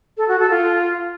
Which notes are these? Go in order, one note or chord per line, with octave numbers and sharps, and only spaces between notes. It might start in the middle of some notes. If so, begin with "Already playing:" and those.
A4
F#4
A4
F4